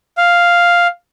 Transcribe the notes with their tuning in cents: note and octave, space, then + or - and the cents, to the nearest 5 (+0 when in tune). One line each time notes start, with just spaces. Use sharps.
F5 +0